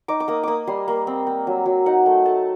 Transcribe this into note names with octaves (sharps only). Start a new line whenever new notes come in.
D#4 D6
D6
A#3 D#6
A#3 D6 D#6
G3 C6
A#3
C4
C4
F#3
F#3
D#4 F#5
A3
A3 A5